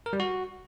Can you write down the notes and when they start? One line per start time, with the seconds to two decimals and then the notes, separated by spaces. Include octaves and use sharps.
0.06 A#4
0.13 G3
0.20 F#4